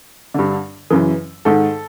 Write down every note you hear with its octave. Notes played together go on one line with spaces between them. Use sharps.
G2 D3
F#2 C#3 E3
G#2 D#3 A4